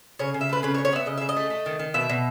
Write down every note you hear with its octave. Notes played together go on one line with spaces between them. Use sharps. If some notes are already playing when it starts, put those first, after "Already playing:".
C#3 C#5
C#3
E5
A3 B4
C#3 B4
C#5
C#3
C#5
B3 E5
C#3 D#5
C#3 E5
D#5
A3
A3
D#3
D#3
B2 E5
B2